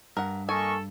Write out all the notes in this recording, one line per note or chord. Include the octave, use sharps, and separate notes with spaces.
G2 A#4 F#5
A#3 A4 D#5 G#5 C#6